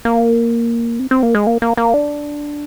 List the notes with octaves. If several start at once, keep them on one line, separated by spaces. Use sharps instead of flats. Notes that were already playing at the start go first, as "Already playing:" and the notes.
A#3
C4
C4
A#3
G#3
A#3
A#3
A#3
D4